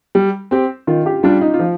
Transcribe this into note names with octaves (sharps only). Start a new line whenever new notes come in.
G3
C4 G4
D#3 F4
G4
G3 D4 F4
D#4
F4
F3